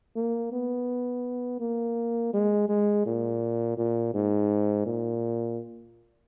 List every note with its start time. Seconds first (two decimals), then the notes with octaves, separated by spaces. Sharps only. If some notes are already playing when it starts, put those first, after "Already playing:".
0.16 A#3
0.52 B3
1.60 A#3
2.33 G#3
2.69 G#3
3.06 A#2
3.78 A#2
4.14 G#2
4.86 A#2